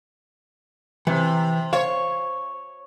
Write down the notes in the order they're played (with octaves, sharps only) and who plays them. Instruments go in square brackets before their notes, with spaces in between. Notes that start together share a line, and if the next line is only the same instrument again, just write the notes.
[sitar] C3 [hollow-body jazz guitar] E3
[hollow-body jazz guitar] C5 F5 [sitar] C#5